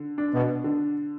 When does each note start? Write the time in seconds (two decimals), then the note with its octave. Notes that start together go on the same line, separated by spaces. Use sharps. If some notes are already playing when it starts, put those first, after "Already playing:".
Already playing: D3
0.18 D4
0.33 B2
0.64 D3